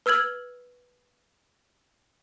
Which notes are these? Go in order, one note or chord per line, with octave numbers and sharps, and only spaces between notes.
B4 E6 F6 G#6 F#7